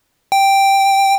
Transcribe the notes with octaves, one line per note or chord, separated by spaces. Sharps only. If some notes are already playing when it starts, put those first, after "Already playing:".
G5